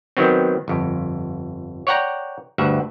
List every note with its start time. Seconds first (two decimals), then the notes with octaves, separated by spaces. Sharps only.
0.17 D#3 F#3 B3 C4
0.68 G1 F2
1.87 C#5 D5 F#5 G5 A#5
2.58 D2 G2 E5 F#5